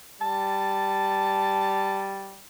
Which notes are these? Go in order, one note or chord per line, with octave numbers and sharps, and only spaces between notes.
G3 A5